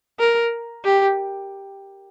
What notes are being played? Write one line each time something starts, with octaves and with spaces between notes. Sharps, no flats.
A#4
G4